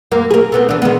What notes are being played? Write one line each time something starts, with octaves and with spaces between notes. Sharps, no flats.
F#2 A#3
G#4 A#4
A3 B3 C4
E3 D4
D#3 G#3 B3